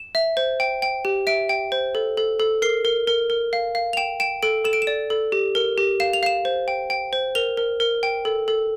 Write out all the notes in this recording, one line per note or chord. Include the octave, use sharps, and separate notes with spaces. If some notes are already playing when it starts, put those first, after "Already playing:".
Already playing: E7
E5
C5
G5
G5
G4
E5 D7
G5
C5
A4
A4
A4
A#4 C7
A#4
A#4
A#4
F5
F5
F7
G5 E7
G5 E7
A4 D7
A4 E7
D7
E7
D5
A4
G4
A#4
G4
F5 E7
F7
F5 E7
C5
G5
G5
C5
A#4 F7
A#4
A#4
G5
A4
A4